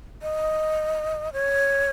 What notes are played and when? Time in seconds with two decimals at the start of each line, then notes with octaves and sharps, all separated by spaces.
0.22 D#5
1.33 C#5